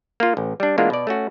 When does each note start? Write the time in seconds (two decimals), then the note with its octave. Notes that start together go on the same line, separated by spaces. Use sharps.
0.20 A#3 F4
0.37 A1
0.60 G3 D4
0.78 E3 G#3 A#3 B3 D4 F4
0.90 B2 D5
1.07 A3 C#4 F#4